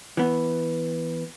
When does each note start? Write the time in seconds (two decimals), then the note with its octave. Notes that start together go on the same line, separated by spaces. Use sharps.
0.17 E3 B3